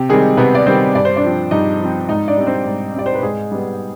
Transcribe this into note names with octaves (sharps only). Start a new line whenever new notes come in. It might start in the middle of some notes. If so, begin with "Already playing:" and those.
Already playing: C3 G4
D#3 G3 G#3 C4 G#4
C3 B3 B4
D5
D#3 G3 C4 C5
G2 D5
C5
D4 D5
F3 C4
G2 D#4 D#5
F3 C4
G#2 D#4 D#5
D4 D5
G3 C4
C4 C5
G#2
G3 C4 D5
C5
B4
G#2 G#3 G#4
G3 B3